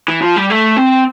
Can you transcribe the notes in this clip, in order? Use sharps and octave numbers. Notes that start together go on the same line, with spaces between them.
E3
F3
G3
A3
C4